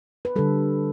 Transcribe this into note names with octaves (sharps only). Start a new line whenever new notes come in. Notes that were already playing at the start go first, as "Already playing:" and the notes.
B4
D3 G3 A4